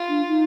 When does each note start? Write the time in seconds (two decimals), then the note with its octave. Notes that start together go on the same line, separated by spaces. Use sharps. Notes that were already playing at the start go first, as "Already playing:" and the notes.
Already playing: F4
0.09 D4
0.28 D#4